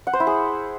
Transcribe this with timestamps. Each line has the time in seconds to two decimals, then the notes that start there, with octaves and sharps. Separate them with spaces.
0.07 F#5
0.13 C5
0.20 E4
0.27 G#4